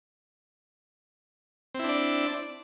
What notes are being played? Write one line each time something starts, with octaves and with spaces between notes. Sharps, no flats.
C4 D4 E4 D5